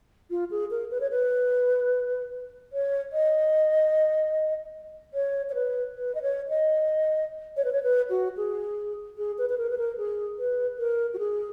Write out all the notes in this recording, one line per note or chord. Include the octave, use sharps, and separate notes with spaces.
F4
G#4
A#4
B4
C#5
B4
C#5
D#5
C#5
C#5
B4
B4
D#5
C#5
D#5
C#5
B4
C#5
B4
F#4
G#4
G#4
B4
B4
A#4
B4
A#4
G#4
B4
A#4
F#4
G#4